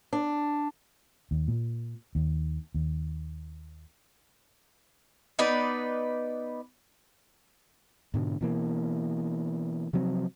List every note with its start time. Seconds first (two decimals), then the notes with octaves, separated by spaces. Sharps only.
0.13 D4
1.31 D#2
1.48 A#2
2.15 D#2
2.74 D#2
5.39 B3 D#4 B4 D5
8.14 G#2 B2 D3
8.41 B2 E3 A#3
9.93 C3 F3 F#3 C4